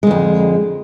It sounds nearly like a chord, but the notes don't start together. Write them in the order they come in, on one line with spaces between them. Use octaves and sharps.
G#3 D3 F2